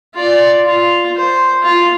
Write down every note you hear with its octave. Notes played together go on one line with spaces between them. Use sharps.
F4 D5
F4
C5
F4